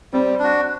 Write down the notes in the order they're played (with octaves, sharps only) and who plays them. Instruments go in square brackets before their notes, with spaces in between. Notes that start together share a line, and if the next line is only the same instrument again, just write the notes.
[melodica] G3 [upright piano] C4
[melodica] D4 F#4